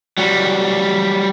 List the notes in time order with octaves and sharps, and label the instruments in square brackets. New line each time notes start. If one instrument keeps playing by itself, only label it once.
[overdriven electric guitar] F#3 G3